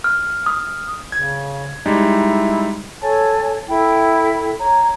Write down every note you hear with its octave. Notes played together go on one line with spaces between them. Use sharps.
F6
D#6
C#3 G#6
G3 G#3 D#4 E4
A4 C#5 G#5 A5
E4 A4 G5
C#5 A#5